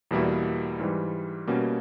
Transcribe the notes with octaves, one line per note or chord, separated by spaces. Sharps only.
E2 B2 G3 A#3 E4
G#2 E3 G3
B2 G3 A#3 C#4